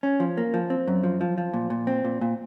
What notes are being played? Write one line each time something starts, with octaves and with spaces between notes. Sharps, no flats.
C#4
F3
A#3
F3
C4
F#2
F3
F3
F3
A#2
A#2
C4
A#2
A#2